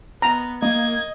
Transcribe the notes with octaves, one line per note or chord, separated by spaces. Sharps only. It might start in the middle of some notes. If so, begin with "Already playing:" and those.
B3 A#5
A#3 D#5 G#6